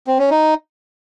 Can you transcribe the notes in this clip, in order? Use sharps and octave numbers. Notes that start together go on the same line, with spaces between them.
C4
C#4
D#4